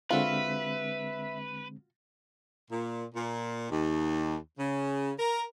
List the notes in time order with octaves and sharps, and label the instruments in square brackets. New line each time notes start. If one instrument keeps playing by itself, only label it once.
[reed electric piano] D3 G#3 C4 [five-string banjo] F4 F#4 [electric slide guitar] B4 [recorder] E5
[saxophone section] A#2
A#2
D#2
C#3
A#4